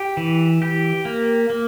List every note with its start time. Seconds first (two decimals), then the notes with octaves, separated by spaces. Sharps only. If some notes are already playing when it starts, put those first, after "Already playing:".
Already playing: G4
0.17 E3
0.62 G4
1.05 A#3
1.50 A#3